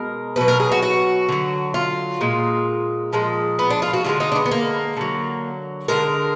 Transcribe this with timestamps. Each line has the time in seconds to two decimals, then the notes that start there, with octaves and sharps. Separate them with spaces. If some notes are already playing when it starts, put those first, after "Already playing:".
Already playing: B2 G#3 A#4
0.36 B2 F#3 B4
0.48 A#4
0.60 G#4
0.72 F#4
0.83 F#4
1.29 D3 F#3
1.74 F4
2.21 A#2 G#3
3.13 A#2 F3 G#3
3.59 B3
3.70 D4
3.82 F4
3.93 F#4
4.04 D3 F3 F4
4.09 G#3
4.20 D#4
4.32 D4
4.35 B3
4.46 B3
4.51 A#3
4.97 D3 F#3
5.88 D3 G#3 A#4